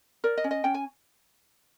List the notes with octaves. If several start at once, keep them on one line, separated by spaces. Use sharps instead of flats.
A#4 D5
D#5
C#4
D#5
C#4 G5
G#5